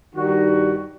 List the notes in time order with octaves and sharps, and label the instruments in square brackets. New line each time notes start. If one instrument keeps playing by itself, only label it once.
[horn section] G2 D#3 G3 D#4 F#4